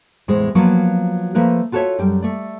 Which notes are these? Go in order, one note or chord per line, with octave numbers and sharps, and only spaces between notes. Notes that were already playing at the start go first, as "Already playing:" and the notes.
E2 A2 G#3 C5
F3 F#3 A#3 B3 F4 F#4
F3 A3 A#3 A#4 B4
F4 F#4 A4 A#4 C#5 E5
F#2 G3 G5
A3 D5